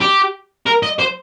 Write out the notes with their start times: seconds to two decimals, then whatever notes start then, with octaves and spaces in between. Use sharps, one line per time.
0.01 G4
0.66 A#4
0.83 D#5
0.99 C5